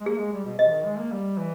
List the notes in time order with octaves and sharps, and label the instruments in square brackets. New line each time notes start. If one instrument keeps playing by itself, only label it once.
[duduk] G#3
[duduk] A#3 [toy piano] G#4
[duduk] G#3
G3
B2
[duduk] B2 [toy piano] D#5
[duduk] E3
D#3
G#3
A#3
G3
E3